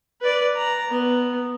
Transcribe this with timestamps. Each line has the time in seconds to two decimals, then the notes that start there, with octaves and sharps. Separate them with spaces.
0.22 B4 D5
0.57 A#5
0.90 B3